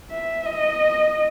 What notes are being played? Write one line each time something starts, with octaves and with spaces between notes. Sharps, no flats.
E5
D#5